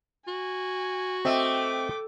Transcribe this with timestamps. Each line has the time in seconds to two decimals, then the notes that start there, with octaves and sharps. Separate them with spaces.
0.28 F#4 G#5
1.25 A3 C4 D#5 E5 G5 D6